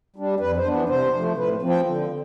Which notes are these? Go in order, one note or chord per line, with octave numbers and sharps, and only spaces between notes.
G3 D4
F2 B4
C5
E3 B3 D4
C3 C5
F3 A3
A2 B4
F3 C4
G5
D3